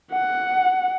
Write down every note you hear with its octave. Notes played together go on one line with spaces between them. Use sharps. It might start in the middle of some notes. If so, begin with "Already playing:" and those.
F#5